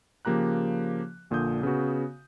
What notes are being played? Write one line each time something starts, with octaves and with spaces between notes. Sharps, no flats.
C#3 F3 A#3 G4 A#5 F#6
A#1 A#2 D3 D#6 G6
C#3 B3 F#4